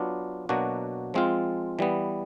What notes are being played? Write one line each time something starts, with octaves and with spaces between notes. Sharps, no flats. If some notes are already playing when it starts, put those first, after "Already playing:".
Already playing: F#3 B3 D4 F4
B2 F#3 A#3 D4 F#4
F3 G#3 C4 F4
E3 G3 B3